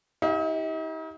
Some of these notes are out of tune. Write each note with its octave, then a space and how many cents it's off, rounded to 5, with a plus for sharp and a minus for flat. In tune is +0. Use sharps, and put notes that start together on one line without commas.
D#4 +45 G4 +0 F5 +0